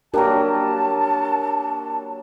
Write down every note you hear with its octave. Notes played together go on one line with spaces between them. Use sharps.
F#3 A#3 D4 G4 A#4 A5